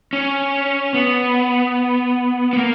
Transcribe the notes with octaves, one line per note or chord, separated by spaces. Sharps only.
C#4
B3
B3
A#3